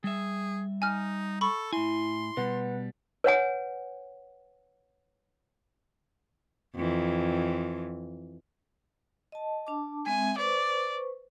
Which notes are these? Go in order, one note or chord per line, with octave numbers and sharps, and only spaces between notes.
G3 G#4 E5
D#4 G#5 F6
A4 B5 C#6
A2 E4 G#5 C6
B2 G3 B4 F#5
B4 C#5 F#5 G#5
F2 E3
D#5 A5
D4 A5 D6
G#3 C4 E5 G#5
B4 C5 D5 C#6